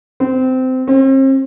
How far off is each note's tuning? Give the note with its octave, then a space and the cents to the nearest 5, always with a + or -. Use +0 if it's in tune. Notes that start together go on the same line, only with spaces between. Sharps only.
C4 -20
C4 +40